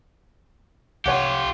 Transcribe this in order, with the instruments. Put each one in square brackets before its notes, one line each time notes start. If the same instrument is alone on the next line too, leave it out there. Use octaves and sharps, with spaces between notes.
[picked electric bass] C2 [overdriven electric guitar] F4 G4 [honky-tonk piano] C#5 F#5